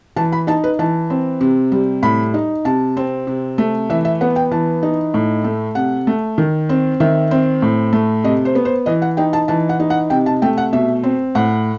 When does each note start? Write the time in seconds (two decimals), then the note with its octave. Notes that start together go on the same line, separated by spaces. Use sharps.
0.16 E3 A5
0.32 B5
0.47 D#4 A5
0.64 B4
0.79 E3 A5
1.10 C4
1.41 C3
1.72 G3
2.03 A2 B5
2.34 D#4
2.65 C3 A5
2.97 C4
3.27 C3
3.58 A3
3.90 E3 E5
4.05 E5
4.21 B3 F#5
4.36 G5
4.51 E3 A5
4.83 D#4
5.14 A2
5.44 A3
5.75 C3 F#5
6.07 A3
6.38 D#3
6.69 C4
7.00 D#3 E5
7.31 C4
7.62 A2
7.93 A3
8.24 C3 D#5
8.45 C5
8.55 B3
8.65 C5
8.86 E3 D#5
9.02 F#5
9.17 D#4 G5
9.33 A5
9.48 E3 A5
9.69 F#5
9.80 D#4
9.90 F#5
10.10 C3 G5
10.26 A5
10.42 A3 G5
10.58 F#5
10.73 B2 E5
11.03 C4
11.35 A2 F#5